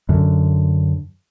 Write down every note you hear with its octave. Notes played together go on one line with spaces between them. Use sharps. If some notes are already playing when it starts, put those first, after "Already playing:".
F#2 D3